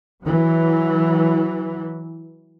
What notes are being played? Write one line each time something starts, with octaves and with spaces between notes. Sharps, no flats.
E3 F#3